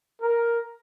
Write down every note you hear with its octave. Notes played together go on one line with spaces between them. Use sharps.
A#4